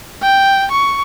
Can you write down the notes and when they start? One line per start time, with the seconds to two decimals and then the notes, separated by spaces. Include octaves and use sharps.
0.22 G5
0.71 C#6